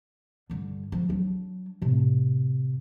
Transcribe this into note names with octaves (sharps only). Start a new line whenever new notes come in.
G2 D3
D3 F3
F#3 D4
A2 C3